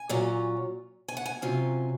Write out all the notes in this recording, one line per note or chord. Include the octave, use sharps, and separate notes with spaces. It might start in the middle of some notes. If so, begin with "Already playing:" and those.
Already playing: G#5
A#2 F#3 C#4 F4
G#5
F#5
G#5
C3 F#3 C#4 F4